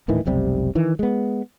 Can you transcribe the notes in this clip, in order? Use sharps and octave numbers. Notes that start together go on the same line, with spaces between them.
D#1 A2 D#3 E3
F1 B1 C3 G3
D#3 E3
G#3 B3